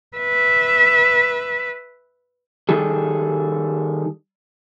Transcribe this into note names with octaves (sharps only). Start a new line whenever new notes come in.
B4 E5
D#3 G3 G#4 A4